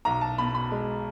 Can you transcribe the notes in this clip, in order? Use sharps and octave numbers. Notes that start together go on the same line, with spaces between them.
B1 A#5
A5
B2 B5
B5
G#3